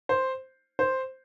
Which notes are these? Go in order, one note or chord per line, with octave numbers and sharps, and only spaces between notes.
C5
C5